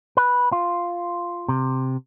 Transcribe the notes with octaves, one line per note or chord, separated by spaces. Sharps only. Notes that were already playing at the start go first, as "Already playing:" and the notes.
B4
F4
C3